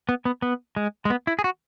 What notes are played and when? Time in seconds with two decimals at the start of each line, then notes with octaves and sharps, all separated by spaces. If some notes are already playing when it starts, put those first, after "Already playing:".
0.09 B3
0.25 B3
0.42 B3
0.76 G#3
1.05 G#3
1.10 B3
1.27 E4
1.39 G#4
1.44 F#4